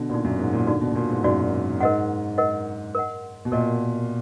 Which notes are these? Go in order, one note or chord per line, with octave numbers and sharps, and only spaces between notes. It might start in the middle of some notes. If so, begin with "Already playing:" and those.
Already playing: B2 D3
A#2 D#4 F#4 D5
F#2
G#2
A#2
D3 D#4 F#4 D5
B2
B2
A#2
G#2
F#2 D#4 F#4 D5
G#2 A#4 D#5 F#5
A#4 D#5 F#5
A#4 D#5 F#5
B2
A#2 A#4 D#5 F#5